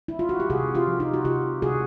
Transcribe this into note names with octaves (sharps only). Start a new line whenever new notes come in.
E4
F4
F#4
G4
C3 F#4 G#4
F4 G4
F3
D#4 F4
F#4
C3 F4 G4
C3 F#4 G#4